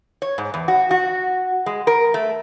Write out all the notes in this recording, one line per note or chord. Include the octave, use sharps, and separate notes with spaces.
C#5
G#2
E2
F#4
F#4
G#3
A#4
A3